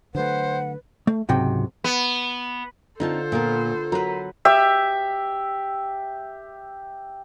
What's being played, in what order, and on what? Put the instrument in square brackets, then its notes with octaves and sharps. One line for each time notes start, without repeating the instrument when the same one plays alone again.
[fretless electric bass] D3 F#3 A3 [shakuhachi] B4 [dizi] C5 [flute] F#5
[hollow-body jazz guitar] A3
C#2 G#2 C3 F#3 G5
[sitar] B3
[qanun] D3 F4 A5 [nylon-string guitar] C4 D#4 [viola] A4 C5
[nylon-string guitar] A#2 [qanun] B3 F4 A#4
[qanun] F#3 B4 [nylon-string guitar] A#4
[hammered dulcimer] G4 E5